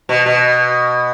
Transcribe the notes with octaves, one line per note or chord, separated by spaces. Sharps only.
B2
B2